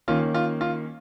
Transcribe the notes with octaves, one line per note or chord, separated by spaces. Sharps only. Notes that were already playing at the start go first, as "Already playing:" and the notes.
D#3 A#3 C#4 F4
F4
F4